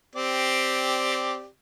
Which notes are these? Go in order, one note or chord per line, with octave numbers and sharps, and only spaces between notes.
C4 G4 D5